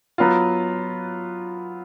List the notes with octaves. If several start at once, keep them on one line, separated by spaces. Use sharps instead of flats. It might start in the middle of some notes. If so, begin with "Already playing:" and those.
F#3 B3 F4